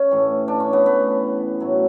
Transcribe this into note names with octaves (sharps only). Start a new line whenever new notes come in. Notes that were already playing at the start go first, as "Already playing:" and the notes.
Already playing: C#4
A2 E3
D4
C#4
B3
A2 E3 B3
A2 F#3